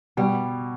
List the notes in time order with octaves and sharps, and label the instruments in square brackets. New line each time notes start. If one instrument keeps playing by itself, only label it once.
[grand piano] B2 [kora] G3